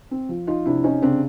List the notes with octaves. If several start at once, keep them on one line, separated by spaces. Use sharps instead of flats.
C4
F3
D#4 F4
C3 D4 E4
C#4 D#4
C#3 C4 D4